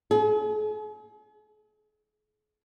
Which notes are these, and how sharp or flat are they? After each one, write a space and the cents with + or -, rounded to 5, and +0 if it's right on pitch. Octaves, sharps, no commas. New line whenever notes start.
G#4 +45 G#5 -30